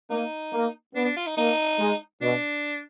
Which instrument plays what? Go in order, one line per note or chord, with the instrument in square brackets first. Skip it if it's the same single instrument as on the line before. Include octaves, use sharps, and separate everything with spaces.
[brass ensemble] A#3 [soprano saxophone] D#4
[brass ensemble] A#3
[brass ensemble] B3 [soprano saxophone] D4
[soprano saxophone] D4
F4
D#4
[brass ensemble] A#3 [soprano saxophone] D#4
[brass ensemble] G#3
[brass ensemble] B2 [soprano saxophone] D4